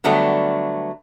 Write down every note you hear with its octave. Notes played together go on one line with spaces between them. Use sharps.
D3 F#3 G3 A3 B3 D4